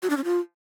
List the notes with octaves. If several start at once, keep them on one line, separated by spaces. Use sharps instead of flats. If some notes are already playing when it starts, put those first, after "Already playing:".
F#4
D4
C#4
F4